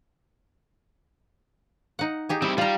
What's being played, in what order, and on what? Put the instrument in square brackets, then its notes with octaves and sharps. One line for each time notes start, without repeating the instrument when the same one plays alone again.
[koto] D#4 F#5
D#4 G4 G#4
[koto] G3 [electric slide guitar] C4 E4
[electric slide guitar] G3 [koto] F4 A#5